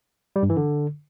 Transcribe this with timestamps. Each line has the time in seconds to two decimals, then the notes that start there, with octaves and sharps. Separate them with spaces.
0.36 G3
0.43 G2
0.50 E3
0.57 D3